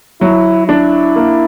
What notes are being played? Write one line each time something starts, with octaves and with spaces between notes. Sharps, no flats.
F#3 E4
D4 E4
A#3